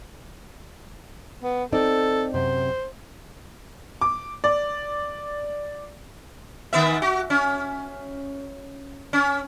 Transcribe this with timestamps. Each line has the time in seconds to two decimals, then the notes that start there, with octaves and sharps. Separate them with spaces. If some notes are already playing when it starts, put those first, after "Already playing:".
1.42 B3
1.72 C4 D#4 A4 D5
2.34 F#2 C3 C5
4.01 D6
4.44 D5
6.73 D#3 B3 E5
7.02 F#4
7.30 C#4
9.13 C#4